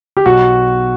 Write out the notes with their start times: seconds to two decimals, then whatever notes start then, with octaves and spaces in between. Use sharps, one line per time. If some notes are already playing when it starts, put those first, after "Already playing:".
0.17 G4
0.25 B1 F#4